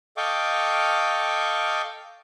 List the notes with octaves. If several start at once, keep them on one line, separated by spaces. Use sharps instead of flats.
A4 D#5 F5 G5 C#6 D6